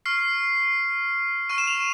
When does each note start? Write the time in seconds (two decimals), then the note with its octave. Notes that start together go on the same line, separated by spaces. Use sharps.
0.06 C#6 F6 C7
1.49 C#6 F6 D#7
1.58 E7
1.67 F7